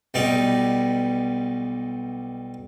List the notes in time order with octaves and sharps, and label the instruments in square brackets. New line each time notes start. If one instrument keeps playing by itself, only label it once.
[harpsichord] B1 G3 B3 D#4